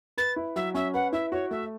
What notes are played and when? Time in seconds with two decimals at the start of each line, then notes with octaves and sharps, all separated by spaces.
0.17 B4 A6
0.36 E4
0.56 F#3 E5
0.74 C#4 E5
0.94 B4 F#5
1.13 E4 E5
1.32 F#4 C#5
1.51 A3 E5